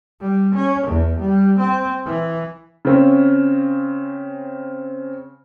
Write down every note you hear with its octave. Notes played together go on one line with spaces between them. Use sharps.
G3
C#4
E2
G3
C4
E3
C#3 C4 C#4